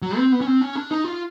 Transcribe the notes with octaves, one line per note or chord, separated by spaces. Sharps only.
F#3
C4
B3
C#4
C4
C#4
D4
D#4
F4